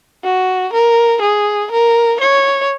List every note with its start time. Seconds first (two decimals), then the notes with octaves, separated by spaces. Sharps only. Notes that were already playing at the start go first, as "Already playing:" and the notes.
0.24 F#4
0.73 A#4
1.22 G#4
1.71 A#4
2.20 C#5